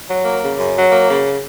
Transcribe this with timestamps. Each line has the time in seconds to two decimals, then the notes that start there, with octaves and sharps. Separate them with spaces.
0.09 F#3
0.25 A#3
0.42 C#3
0.58 F#2
0.75 F#3
0.91 A#3
1.08 C#3